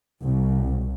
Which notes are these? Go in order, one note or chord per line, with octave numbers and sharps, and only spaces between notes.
C2